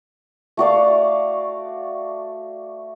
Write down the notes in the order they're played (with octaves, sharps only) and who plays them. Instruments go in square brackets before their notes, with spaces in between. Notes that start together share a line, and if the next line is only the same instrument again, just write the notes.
[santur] A3 F#4 D5 F5